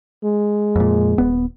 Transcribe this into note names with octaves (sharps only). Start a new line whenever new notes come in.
G#3
F2 A#2
D#1 B3